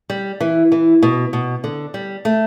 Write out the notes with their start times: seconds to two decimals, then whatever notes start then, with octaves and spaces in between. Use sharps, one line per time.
0.10 G3
0.41 E3
0.72 E3
1.03 B2
1.33 B2
1.64 D3
1.94 G3
2.25 A3